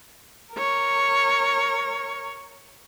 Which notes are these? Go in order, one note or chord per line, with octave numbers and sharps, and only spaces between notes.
A#4 C#5